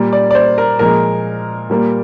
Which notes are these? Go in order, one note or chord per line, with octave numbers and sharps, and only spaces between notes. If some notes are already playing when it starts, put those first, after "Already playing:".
Already playing: A#2 G3 A#3
D5
D5
C5
A#4
A#2 F3 G#3 A#4
A#2 G3 A#3